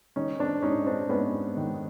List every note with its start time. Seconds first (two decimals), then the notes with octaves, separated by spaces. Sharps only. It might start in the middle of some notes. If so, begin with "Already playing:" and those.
0.16 D#3 C#4 D#4
0.39 C4 D4
0.62 G#2 C#4 D#4
0.86 C4 D4
1.09 G#2 B3 C#4
1.57 D#3